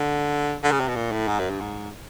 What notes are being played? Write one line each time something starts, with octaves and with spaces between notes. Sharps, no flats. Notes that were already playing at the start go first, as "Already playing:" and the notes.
Already playing: D3
D3
C#3
C3
B2
A#2
A2
G#2
F#2
G2
G#2